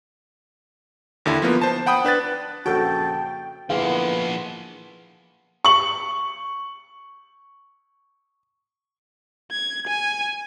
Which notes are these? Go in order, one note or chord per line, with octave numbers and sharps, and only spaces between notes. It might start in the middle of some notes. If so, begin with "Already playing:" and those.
D#2 D3 E4
F3 A#3 B3
C5 A5
F#5 G5 B5 D#6
D4 B4 F#6 A6
A#1 F2 C#3 F#4 A4 G5 A5
D3 F3 A#3 B3 E4 G#4 F5
C#6 F#7
G#6
G#5